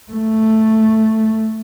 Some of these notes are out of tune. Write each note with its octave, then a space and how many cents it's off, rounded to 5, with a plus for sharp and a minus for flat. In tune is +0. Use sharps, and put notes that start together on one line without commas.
A3 +0